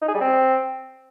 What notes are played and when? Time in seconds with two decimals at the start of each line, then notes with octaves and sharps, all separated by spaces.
0.02 D#4
0.08 G#4
0.15 G3
0.21 C4